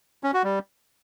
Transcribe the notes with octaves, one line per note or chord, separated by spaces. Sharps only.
C#4
F#4
G3